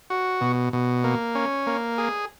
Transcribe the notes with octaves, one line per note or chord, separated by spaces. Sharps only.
F#4
B2
B2
A#3
C#4
A#3
G#4